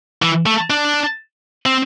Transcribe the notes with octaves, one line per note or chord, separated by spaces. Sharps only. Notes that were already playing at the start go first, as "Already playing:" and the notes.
E3
A3
D4
C4